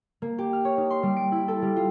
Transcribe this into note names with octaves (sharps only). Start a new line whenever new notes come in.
A#3
G4
F6
C#5
D#4
C6
G3
D7
E4
A4
G3
F4